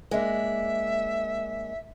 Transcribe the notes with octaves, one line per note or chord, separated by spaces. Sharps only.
G#3 A#3 D4 E5